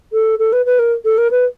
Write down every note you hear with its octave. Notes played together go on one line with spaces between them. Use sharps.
A4
A4
B4
B4
A#4
A4
A#4
B4